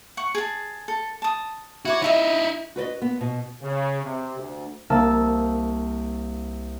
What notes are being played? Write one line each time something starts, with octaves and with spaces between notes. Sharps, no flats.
F#5 C#6
G#4 A5
A4
A5 D#6
E4 F#4 C#5 D6
D#4 E4 D#5 E5 A#5
F#4 B4 D5 D#5
B3
B2
C#3
C3
D2
C2 A#3 A5 E6